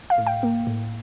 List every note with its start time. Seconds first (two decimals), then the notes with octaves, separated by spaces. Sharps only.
0.10 F5
0.18 A2
0.27 G5
0.43 A#3
0.67 A2